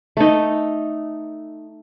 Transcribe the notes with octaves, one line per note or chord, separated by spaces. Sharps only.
A3 D#4